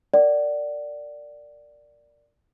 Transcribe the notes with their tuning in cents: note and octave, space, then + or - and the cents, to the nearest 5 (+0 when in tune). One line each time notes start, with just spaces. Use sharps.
A#4 -15 D5 +0 F#5 +40